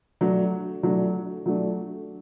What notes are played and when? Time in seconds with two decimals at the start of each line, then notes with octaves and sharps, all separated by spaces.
0.21 F#3 A3 D4
0.83 F#3 A3 D4
1.46 F#3 A3 D4